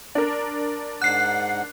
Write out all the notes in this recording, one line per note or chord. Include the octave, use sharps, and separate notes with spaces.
D4 A#4
G#2 F#5 F#6 C7